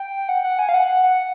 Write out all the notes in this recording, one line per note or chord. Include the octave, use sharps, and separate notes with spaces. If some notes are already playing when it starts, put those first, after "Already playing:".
Already playing: G5
F#5
F#5
G#5
F5
F#5